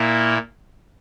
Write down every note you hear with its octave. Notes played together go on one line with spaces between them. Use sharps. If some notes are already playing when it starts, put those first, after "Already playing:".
Already playing: A#2 A#3 E4